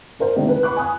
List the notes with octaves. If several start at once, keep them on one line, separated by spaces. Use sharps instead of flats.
G2 A#4 C5
C3 D#3 G#3 A3 D4
B4
B5 C#6 D6 F#6
G#5 B5 D#6 F#6